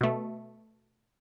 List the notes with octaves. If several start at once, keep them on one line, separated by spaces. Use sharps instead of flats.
B2 A3